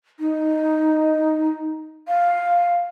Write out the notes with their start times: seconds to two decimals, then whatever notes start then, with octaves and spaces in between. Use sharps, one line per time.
0.20 D#4
2.08 F5